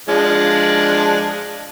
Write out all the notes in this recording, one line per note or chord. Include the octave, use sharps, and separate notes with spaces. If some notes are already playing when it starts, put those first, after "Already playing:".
F3 G#3 D4